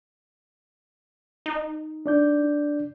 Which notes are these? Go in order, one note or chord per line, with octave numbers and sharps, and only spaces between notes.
D#4
D4 D5 G6